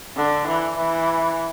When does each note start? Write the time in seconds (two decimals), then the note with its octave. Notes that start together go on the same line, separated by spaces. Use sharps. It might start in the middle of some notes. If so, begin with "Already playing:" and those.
0.16 D3
0.47 E3
0.78 E3